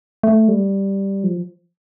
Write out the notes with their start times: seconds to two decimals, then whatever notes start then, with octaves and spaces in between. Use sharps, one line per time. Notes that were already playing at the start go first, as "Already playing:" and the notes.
0.23 A3
0.48 G3
1.24 F3